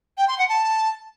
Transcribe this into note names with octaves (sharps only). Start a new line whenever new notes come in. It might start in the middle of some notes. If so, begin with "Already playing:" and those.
G5
C6
F#5
A5